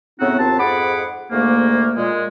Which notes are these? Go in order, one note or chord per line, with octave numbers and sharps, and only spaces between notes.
A2 C#3 B3 C4 D#4 F#4
D#2 C3 C4 F4 A5
F2 G#2 G#4 F#5 B5 D6
D2 G#2 A3 A#3
A#2 G#3